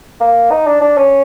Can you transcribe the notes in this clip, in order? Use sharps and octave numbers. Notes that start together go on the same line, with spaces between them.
A#3
D#4
D4
D4
C#4